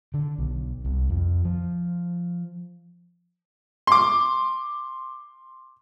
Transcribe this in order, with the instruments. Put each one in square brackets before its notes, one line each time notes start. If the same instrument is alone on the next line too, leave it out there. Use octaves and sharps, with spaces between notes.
[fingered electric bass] D3
B1
C2
F2
F3
[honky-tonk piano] C6 D6